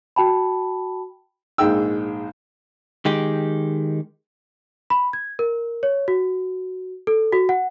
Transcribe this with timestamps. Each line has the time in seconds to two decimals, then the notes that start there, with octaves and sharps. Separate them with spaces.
0.16 F#4 G5 A5 B5
1.58 A#1 G#2 D#4 G#4 G5 E6
3.05 D#3 G#3 G4
4.90 B5
5.13 G#6
5.39 A#4
5.83 C#5
6.08 F#4
7.07 A4
7.33 F#4
7.49 F#5